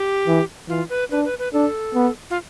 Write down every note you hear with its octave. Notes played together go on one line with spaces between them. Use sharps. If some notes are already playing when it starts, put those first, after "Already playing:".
Already playing: G4
E3
E3 F4
B4
D4 B4
B4
B4
D4 A4
B3
F4